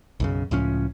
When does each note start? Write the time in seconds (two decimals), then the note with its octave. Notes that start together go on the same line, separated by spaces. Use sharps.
0.20 B1 F#2 C#3
0.51 C#2 A2 F3 C#4